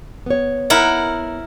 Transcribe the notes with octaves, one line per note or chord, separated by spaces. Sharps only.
B3 C#5
E4 A#4 F#5